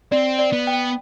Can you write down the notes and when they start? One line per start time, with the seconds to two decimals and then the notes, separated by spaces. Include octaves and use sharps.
0.12 C4 D5
0.39 D5
0.52 B3
0.67 G5